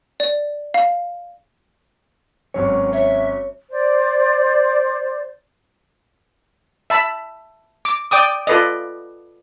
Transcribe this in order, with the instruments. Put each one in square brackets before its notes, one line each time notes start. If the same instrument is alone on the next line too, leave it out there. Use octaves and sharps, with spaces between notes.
[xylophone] D5
F5
[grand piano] G#1 F#3 C#4 [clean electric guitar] C#5
[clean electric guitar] C#5 [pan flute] E5
[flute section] C5 D5
[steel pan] E5 A5 B5
D6
D5 G5 D6 D#6
F4 A4 B4 D5 D#5